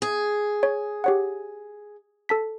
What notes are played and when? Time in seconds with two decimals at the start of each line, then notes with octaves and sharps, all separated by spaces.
0.02 G#4
0.63 C#5
1.04 G4 C#5 F#5
2.29 A4 A5 B6